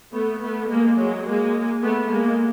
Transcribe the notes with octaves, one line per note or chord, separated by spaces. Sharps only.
A3 B3
A3 B3
G#3 A#3
F#3 G#3
G#3 A#3
A3 B3
G#3 A#3